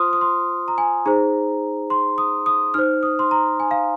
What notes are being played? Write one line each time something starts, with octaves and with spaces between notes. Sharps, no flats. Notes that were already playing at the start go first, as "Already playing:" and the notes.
Already playing: F4 C5 C6 D#6 F6
D#6
C6
A#5
G#5
D#4 G#4 C5 A#5
C6
D#6
D#6
D#4 C5 F6
D#6
C6
A#5
G#5
F5